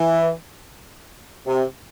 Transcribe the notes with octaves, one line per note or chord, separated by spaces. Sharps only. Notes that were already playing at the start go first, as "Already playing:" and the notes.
Already playing: E3
C3